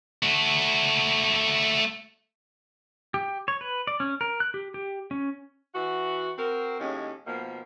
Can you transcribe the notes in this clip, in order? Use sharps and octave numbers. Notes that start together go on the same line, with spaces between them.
A3 F#4
G4
C#5
B4
D5
C#4
A#4
F#6
G4
G4
C#4
E3 F#4
C4 F#4 A#4
D#2 A2 G#3 C#4
B2 D#3 F3 A#3